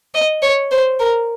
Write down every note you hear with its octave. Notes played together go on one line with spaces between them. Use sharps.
D#5
C#5
C5
A#4